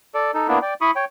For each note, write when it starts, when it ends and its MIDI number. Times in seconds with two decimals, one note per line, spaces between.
0.14 0.31 69
0.14 0.31 74
0.34 0.47 63
0.34 0.47 69
0.48 0.59 58
0.48 0.59 59
0.48 0.59 62
0.48 0.59 64
0.62 0.74 74
0.62 0.74 79
0.81 0.91 64
0.81 0.91 83
0.81 0.91 85
0.81 0.91 87
0.96 1.05 73
0.96 1.05 79